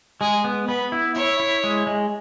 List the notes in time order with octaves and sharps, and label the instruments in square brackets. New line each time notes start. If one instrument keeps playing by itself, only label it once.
[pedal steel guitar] G#3 [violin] G#4
[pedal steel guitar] B3
[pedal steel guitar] B3 [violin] B4
[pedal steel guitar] E4
[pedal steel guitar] E4 [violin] C#5
[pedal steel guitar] E4
G#3
G#3